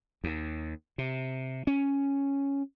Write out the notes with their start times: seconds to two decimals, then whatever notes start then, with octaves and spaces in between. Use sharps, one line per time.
0.24 D#2
0.98 C3
1.67 C#4